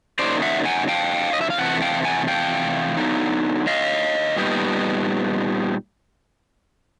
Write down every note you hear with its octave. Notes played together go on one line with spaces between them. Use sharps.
C#3 F#3 A#3 D#4 C5 D5
E5 F#5
F#5 G#5
F5 G5
D#5
E5
F5
C3 E3 A3 F#5
F5 G5
F#5 G#5
F5 G5
D3 F#3 B3 D#4
D#5 F5
A#2 G3 B3 D#4